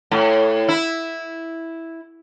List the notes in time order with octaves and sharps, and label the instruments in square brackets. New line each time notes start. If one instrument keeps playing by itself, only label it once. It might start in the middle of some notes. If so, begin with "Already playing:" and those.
[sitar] A2
E4